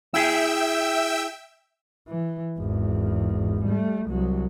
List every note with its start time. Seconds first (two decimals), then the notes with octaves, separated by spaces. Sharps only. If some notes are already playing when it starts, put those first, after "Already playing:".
0.14 E4 G#4 E5 G5 E6
2.08 E3
2.58 G#1 E2
3.65 G3 A3
4.06 C2 F#3